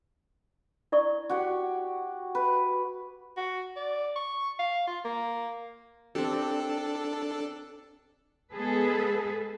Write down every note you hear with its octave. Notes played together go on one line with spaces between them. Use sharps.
E4 D5 C#6
F#4 G4 C#5
B4
F#4
D5
C#6
F5
F4
A#3
C4 D4 G4 A4
G#3 B3 G#4 A4 B4